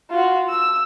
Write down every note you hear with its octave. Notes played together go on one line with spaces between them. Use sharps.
F4 F#4
E6